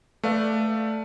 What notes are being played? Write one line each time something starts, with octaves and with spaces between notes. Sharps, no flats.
A3 B4 D5 F5